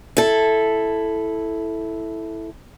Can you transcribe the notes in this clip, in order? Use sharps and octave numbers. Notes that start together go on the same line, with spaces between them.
E4 A4